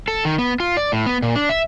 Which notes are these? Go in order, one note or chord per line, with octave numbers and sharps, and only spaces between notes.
A4
D#3
B3
F4
D5
A2
B3
A#2
D4
E5